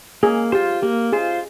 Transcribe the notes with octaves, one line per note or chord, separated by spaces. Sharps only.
A#3 G#4
F4 G4 C5
A#3 G4
F4 G#4 C5